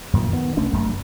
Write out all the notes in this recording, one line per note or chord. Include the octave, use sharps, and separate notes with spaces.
F#2 A#2 D#3 F3
D#3 B3
C2 A3 C#4 D4
F1 F#2 A3